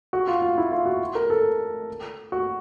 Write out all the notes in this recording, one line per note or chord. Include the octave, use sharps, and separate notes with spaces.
F#4
F4
F4
E4
F4
F#4
A#4
A4
F#4